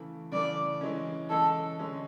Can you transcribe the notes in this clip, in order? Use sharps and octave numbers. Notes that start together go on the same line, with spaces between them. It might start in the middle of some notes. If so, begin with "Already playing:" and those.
Already playing: C#3 E3 A3
C#3 E3 A3 D5
E3 G#3 C#4
E3 G#3 C#4 A4
D3 G#3 C#4